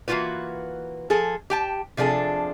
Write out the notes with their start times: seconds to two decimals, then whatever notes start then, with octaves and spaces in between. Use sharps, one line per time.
0.08 E3 A#3 D#4 F4 F#4 B4
1.10 F3 G#4 A4
1.50 G4 G5 A5
1.97 C3 F3 D4 G#4 A4